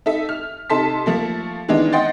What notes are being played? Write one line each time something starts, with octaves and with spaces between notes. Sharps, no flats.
D#4 A4 E5
F6
C3 D#4 A4 A5 C6 B6
F3 A3 A#3
D#3 E3 G#3 B3 D4 D#4
D#5 F#5 G5 C6 A6